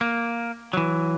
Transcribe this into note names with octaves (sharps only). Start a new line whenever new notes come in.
A#3
E3 F#3